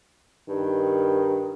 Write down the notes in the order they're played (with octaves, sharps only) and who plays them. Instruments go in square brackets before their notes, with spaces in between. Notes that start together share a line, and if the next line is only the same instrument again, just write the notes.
[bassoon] G2 [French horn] D#3